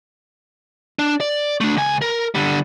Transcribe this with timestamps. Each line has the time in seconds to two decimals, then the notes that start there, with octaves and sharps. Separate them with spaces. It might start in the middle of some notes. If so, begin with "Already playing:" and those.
0.99 D4
1.20 D5
1.61 A3 D4
1.77 C#2 G#5
2.01 A#4
2.35 D3 G3